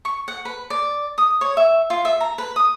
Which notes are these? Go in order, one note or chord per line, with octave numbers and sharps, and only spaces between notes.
C#6
F#5
B4
D5
D#6
C#5
E5
F4
E5
A#5
B4
D#6